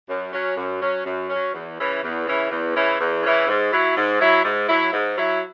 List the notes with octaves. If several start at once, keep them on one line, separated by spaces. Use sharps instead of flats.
F#2
F#3 C#4
F#2
F#3 C#4
F#2
F#3 C#4
E2
C#3 E3 C#4 E4
E2
C#3 E3 C#4 E4
E2
C#3 E3 C#4 E4
E2
C#3 E3 C#4 E4
G#2
F#3 E4
G#2
F#3 E4
G#2
F#3 E4
G#2
F#3 E4